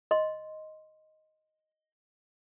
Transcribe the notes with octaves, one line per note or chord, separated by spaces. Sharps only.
D#5 C6